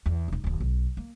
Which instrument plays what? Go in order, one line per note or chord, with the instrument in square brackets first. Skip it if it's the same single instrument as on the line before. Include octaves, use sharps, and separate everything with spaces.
[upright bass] E2
E1 D#4
D1 D#2
B1
A#3